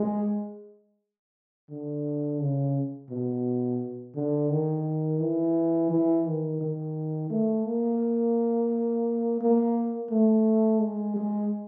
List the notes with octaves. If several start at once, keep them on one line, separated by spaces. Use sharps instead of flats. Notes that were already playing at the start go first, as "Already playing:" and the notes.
Already playing: G#3
D3
C#3
B2
D3
D#3
E3
E3
D#3
D#3
A3
A#3
A#3
A3
G#3
G#3